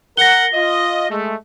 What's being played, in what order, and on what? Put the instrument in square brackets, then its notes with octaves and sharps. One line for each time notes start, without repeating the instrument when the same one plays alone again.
[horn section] A#4 F#5 [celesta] A#6 G7
[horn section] F4 D#5
G#3 A3